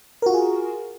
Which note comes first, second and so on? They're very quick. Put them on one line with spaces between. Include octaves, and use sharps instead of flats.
A#4 F#4 F4 G#4